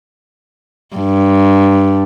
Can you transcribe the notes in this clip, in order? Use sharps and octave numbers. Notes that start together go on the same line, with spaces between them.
G2